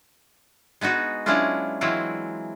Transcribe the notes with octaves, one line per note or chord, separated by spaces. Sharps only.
G#3 B3 D#4 F#4
F#3 G#3 C#4 D4 E4 F4
E3 F#3 G#3 C4 E4 F4